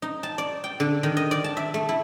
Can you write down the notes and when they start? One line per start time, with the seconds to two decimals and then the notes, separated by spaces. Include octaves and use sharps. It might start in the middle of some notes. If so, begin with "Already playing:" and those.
0.02 D#4
0.23 A5
0.38 D5
0.64 G5
0.80 D3
1.03 D#3
1.17 D#5
1.31 D5
1.44 A5
1.57 E5
1.74 A3
1.89 E4